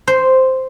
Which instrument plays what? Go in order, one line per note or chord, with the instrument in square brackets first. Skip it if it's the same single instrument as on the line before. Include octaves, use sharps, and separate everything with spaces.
[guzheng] C5